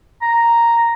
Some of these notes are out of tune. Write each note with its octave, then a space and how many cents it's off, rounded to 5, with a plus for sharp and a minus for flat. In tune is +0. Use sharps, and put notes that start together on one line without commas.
A#5 +0